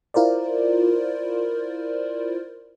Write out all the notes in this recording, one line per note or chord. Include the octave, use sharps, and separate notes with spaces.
E4 F4 A#4 C5 D5